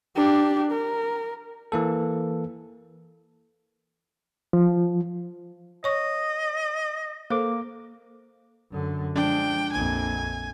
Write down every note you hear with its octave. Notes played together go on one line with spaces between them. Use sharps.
D4 G4
A#4
E3 A#3 A4
F3
C#5 D#5 C#6
A#3 A4 C5 D6
F#2 D3
F3 G#3 D4 G5
A#1 F2 G#5